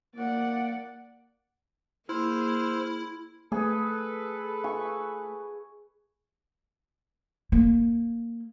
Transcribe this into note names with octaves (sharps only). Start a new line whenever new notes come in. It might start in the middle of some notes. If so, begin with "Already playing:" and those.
A#3 D5 F#5
A#3 E4 G#4 C5 E6 F6
A3 G#4 A4 B4
G#5 C#6
A#3